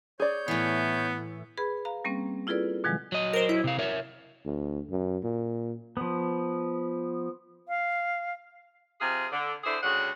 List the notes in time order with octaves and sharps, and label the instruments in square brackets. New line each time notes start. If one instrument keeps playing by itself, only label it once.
[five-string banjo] G#4 D5 [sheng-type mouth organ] C#5 G6
[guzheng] A2 E3 [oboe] B3
[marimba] G#4 B4 B5
F5 A#5
G3 A#3 C4 C#4
E4 F4 G#4 A4 B4 D5
B2 D#3 F3 F#3 G#3
[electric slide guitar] F#3 D#5
[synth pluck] A#4 C5
E4
[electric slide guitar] C3 F5
A#4 C#5 E5
[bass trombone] D2
F#2
A#2
[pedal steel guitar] F3 B3
[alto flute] F5
[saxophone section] C3 F3 F4 G#4
D3
D3 E4 G#4 C5
D2 C#3 G3 F#4 F#5